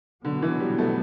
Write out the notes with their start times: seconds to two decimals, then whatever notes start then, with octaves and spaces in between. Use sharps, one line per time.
0.24 B2 D3 F#3 B3
0.42 E3
0.60 G3
0.78 A3